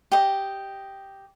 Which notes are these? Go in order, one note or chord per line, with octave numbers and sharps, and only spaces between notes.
G4 D#5